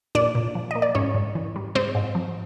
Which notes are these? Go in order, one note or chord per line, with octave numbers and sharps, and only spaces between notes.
A#2 D4 D5
A#2
F3
A#3 D#5
D5
G#2 C#4 C#5
G#2
E3
G3
G#2 C4 C5
G#2
F3